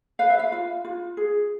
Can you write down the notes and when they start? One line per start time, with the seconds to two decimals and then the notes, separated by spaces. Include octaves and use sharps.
0.19 B4 F5
0.30 E5
0.39 F5
0.52 F4
0.85 F4
1.17 G#4